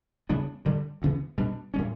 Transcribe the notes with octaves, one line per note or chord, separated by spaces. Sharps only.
C#3 G3 B3 D4
G2 D3 G3
D2 C#3 E3 B3
B2 G3 D4
A2 G3 C#4